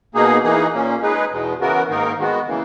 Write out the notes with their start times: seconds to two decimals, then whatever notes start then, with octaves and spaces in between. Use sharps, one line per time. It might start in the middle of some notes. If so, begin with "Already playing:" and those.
0.15 B2 A#3 D#4 G#4
0.44 E3 A#3 D#4 G#4
0.72 A#2 A#3 C#4
1.02 G#3 D#4 G#4 B4
1.31 E2 B2 G#3
1.59 C#3 E3 B3 F#4 A#4
1.89 G#2 D#3 A#3 D#4 A#4
2.18 D#3 G#3 B3 F#4
2.47 C#3 E3 A#3